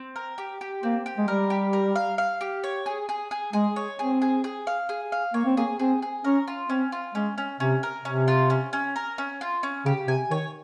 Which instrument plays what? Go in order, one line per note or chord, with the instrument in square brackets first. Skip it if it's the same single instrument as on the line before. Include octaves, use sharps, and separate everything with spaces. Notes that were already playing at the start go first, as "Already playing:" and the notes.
Already playing: [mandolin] C4
A#4
G4
G4
[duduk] A#3 [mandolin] C4
[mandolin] G4
[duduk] G#3
[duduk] G3 [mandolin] A#4
[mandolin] G4
A#4
F5
F5
G4
C#5
G#4
G#4
G#4
[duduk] G#3 [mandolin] G#4
[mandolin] C#5
[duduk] C4 [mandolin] G#4
[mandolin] G#4
G#4
F5
G#4
F5
[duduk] A#3 [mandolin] C#5
[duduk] C4
[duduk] A#3 [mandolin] G#4
[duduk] C4 [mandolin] G#4
[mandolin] G#4
[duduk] C#4 [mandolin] A#4
[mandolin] F4
[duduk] C4 [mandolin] C#4
[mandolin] F4
[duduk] G#3 [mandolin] C#4
[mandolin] C#4
[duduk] C3 [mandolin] C#4
[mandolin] A#4
[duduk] C3 [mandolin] C#4
[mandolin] F4
C#4
C#4
A#4
C#4
F4
C#4
[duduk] C#3 [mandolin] G4
[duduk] C3 [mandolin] G#5
[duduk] D#3 [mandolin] C#5